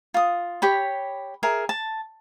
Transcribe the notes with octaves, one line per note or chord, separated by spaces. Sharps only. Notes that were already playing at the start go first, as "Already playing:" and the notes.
F4 D#6
G4 C#5 B5
G#4 A#4 E5
A5